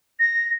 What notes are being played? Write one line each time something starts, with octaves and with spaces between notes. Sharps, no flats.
A#6